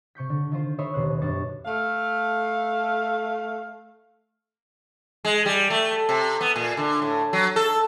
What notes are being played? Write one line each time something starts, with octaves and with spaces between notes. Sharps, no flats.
C3 C#6 G6 B6
D3
D#3 F4 C5
C5 C#5 D#5 E5 B5 C6
D#1 D#2 B2 C5 F#6
F#2 G3 D4 C#6 A6
A3 F5
G#3
G3
A3
C3
B3
A#2
D3
A2
F#3
A4